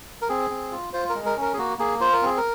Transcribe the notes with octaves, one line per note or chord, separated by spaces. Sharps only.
A#4
C4 G#4
C4
F4
F4 C5
A#4
G#3
A#4
C#4 A#4
G#4
A#3 F#4
A#3 G#4
F4 C5
A#4
C4 G#4
A#4